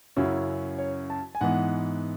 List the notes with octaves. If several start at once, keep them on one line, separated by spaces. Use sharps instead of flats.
F#2 C#3 F#3 C#4 E4
C#5
A5
G#5
G#2 E3 B3 F#5